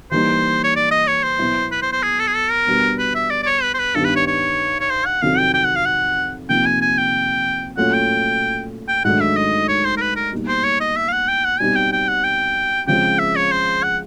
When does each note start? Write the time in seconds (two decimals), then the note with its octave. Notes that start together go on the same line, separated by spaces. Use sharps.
0.11 E3 G3 A#3 D#4 C5
0.64 C#5
0.76 D5
0.91 D#5
1.07 C#5
1.23 C5
1.39 B2 F#3 B3 E4
1.71 B4
1.82 C5
1.92 C5
2.03 G#4
2.19 A4
2.27 G#4
2.35 A4
2.50 A#4
2.67 B2 G3 B3 D4
2.99 B4
3.15 E5
3.30 D5
3.43 D5
3.46 C#5
3.62 B4
3.74 C5
3.79 B4
3.95 G2 D#3 G3 B3 A4
4.04 B4
4.16 C#5
4.27 C#5
4.80 C#5
4.90 C5
5.05 F#5
5.21 F2 C3 D#3 F#3 F5
5.38 G5
5.54 G5
5.64 F#5
5.76 F5
5.85 F#5
6.49 C3 F3 A#3 D#4 G5
6.66 G#5
6.81 G#5
6.98 G5
7.77 A#2 F#3 A3 C#4 F4 F#5
7.93 G5
8.88 G5
9.04 G#2 D#3 F#3 A3 D4 F#5
9.20 E5
9.37 D#5
9.68 C#5
9.85 C5
9.97 A#4
10.01 B4
10.16 A#4
10.32 B2 G3 A#3 D#4
10.48 C5
10.64 C#5
10.80 D#5
10.97 E5
11.08 F5
11.13 F#5
11.28 G5
11.44 F#5
11.60 B2 G3 C4 D#4 G#5
11.76 G5
11.92 G5
12.08 F#5
12.24 G5
12.87 C#3 F3 G#3 C4 G5
13.19 E5
13.36 C#5
13.52 C5
13.83 F#5